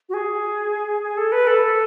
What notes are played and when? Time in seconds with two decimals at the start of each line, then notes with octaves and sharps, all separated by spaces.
0.09 F#4
0.14 G#4
1.03 G#4
1.17 A4
1.32 B4
1.47 A4